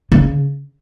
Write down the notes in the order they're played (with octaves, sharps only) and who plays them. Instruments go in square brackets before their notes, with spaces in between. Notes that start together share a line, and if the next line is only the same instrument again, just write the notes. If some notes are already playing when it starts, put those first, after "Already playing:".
[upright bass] C#3